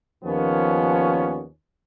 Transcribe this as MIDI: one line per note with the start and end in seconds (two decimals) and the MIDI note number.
0.25 1.45 39
0.25 1.45 46
0.25 1.45 53
0.25 1.45 59
0.25 1.45 61